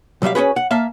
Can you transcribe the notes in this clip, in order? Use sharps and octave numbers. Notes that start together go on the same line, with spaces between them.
B1 F#3 G3 E5 F5
C#4 F#4 G#4 B4
F#5
A#3 E5 F5 A5